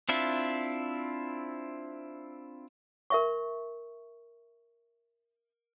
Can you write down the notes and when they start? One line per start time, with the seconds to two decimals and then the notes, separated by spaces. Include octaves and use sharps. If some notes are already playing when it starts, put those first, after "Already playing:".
0.09 C4 D4 E4 F4 E5
3.10 A#4 E5 C#6